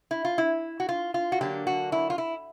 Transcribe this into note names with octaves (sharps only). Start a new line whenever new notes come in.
E4
F4
E4
F#4
F4
F4
F#4
D3 F#3 A#3 D4 G4
F#4
E4
F4
E4